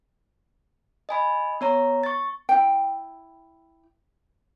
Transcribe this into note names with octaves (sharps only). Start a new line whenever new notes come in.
D#5 G#5 B5
B3 C#5 A#5
C#6 A6
E4 G5